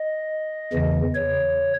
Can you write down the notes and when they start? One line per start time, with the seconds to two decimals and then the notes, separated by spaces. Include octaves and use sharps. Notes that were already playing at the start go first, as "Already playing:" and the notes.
Already playing: D#5
0.72 E2 C#3 E3
1.15 C#5